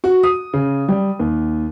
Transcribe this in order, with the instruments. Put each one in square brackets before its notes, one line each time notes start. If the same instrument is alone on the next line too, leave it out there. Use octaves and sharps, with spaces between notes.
[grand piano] F#4
D#6
C#3
G3
D#2